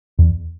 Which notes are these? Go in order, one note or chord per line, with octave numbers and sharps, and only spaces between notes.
E2